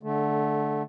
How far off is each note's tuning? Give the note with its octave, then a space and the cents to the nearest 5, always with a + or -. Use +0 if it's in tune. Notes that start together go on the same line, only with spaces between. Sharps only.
D3 +0 A3 -15